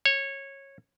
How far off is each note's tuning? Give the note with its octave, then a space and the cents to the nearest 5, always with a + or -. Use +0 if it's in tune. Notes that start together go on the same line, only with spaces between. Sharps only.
C#5 -15